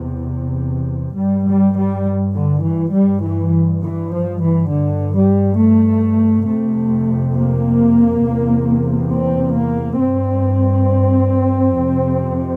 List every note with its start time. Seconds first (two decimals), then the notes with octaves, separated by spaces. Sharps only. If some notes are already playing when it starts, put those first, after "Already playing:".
Already playing: E2 C3
1.16 G2 G3
1.46 G3
1.76 G3
2.34 D3
2.64 E3
2.93 G2 G3
3.22 E3
3.82 E3
4.11 F3
4.41 E3
4.70 G2 D3
5.14 G3
5.58 A3
6.47 F2 C3 A3
7.35 A#3
8.23 E2 C3
9.11 C4
9.56 A#3
10.00 G2 C4
11.76 F2 C3